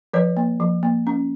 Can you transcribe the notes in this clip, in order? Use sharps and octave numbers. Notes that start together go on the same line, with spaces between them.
F3 B4 C#5
A#3
F3
A#3
C#4